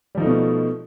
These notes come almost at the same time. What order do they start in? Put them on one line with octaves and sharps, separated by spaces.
G3 F3 D#4 A3 B2